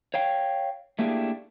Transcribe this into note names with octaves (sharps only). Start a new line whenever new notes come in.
C#5 F5 G5
A3 A#3 D4 E4 G4 G#4